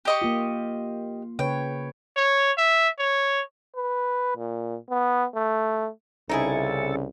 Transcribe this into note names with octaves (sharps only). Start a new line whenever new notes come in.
G4 D#5 C#6
A#3 F4
C#3 B4 C#5 G5
C#5
E5
C#5
B4
A#2
B3
A3
C2 C#3 C#4 D#4 E4 G#4 A4